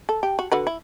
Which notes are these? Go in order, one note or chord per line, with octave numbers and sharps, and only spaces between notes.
A4
G4
F#4
D3 F#4 B4
E4